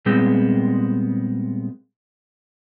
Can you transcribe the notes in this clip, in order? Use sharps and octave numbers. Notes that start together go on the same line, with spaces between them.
A#2 G3 G#3 B3 C4